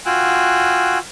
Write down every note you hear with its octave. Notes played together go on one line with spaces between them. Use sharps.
F4 F#4 G5 G#5 E6 F#6